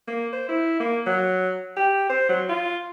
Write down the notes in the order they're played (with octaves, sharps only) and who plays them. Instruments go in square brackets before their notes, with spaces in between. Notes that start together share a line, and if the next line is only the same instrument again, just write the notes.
[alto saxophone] A#3
C5
E4
A#3
F#3
G4
C5
F#3
F4